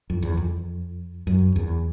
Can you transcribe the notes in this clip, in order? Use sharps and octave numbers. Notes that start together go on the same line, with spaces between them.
F2
E2
F2
F#2
E2